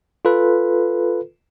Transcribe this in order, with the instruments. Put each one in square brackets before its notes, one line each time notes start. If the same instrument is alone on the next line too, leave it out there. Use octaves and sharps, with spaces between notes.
[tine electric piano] F4 A4 B4